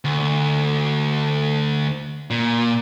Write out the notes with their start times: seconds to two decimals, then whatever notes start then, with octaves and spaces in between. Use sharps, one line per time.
0.05 D2
2.30 A#2